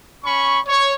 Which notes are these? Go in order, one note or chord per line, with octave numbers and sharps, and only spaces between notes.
C#4 B5 C#6
C#5